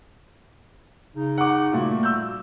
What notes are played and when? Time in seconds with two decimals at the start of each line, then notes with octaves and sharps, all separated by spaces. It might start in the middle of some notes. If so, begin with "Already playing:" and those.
1.16 C#3 D#4
1.38 F#5 D6
1.73 A#2 G3 A3 F#4
2.03 E6 G6